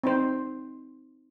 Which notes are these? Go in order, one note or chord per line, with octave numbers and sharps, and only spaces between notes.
C4 D#4 C5